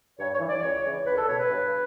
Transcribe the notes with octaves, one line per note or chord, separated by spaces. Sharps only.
G2 C#5
C#5
E3
D5
C#2 C#5
C#3 E3
C#2 B4
A4
B2 C#5
B4
G2